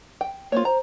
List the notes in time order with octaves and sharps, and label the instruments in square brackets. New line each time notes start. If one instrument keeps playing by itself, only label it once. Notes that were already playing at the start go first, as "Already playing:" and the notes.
[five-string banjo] G5
[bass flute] A#3 [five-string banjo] F4 C5 C#5
[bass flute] C5 [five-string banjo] A#5